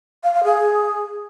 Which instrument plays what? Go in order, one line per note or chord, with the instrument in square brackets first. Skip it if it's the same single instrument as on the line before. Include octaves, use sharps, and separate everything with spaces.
[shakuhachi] F5
F5
G#4